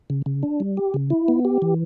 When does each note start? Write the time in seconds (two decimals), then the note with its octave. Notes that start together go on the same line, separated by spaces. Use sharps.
0.10 C#3
0.26 C#3
0.43 D4
0.60 G3
0.77 G4
0.94 C#3
1.10 E4
1.28 B3
1.45 G4
1.62 E3